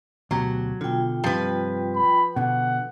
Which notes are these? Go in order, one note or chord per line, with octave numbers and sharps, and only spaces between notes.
D2 B2 F#3 G4
B2 D3 F4 G5
G2 C3 F3 G3 B4
B5
B2 D3 F#5